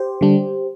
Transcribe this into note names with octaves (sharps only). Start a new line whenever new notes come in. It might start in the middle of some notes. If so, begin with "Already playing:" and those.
Already playing: G4 C5
D3 G3 D4